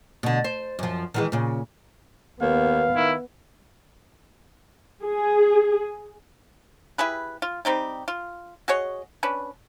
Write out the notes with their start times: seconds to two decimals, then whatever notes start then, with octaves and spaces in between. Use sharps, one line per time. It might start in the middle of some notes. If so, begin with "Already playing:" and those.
0.23 B2 D3
0.44 C5
0.79 F#2 F3
1.14 D#3 E3 G#3
1.32 A#2 C#3
2.41 D#2 B3 F5
2.96 D#3 E4
5.04 G#4
6.98 E4 G4 G#4 B4
7.42 F4
7.65 G3 C4 D#4 G4
8.08 F4
8.68 F#4 G#4 C#5 D#5
9.23 C#4 D4 B4